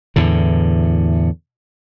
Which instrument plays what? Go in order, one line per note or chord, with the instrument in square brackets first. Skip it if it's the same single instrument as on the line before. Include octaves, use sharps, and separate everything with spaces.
[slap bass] E2 A2 D3